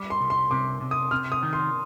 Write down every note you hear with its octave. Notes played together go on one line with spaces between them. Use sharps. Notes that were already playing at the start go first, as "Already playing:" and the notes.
Already playing: G3
C6
C2
C6
C3 D6
C3
D#6
C3 F6
D#6
D#3
C6